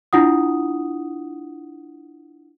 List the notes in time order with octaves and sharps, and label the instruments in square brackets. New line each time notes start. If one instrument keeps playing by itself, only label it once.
[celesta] D4 E4 F4 F#5 D#6